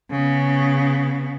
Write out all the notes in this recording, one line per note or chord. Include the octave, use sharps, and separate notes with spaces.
C#3 B3